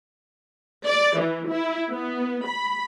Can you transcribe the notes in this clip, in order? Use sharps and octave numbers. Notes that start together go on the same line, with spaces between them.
D5
E3
E4
B3
B5